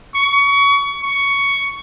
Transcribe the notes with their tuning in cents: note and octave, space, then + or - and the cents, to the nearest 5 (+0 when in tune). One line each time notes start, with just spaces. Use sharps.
C#6 +25
C#6 +10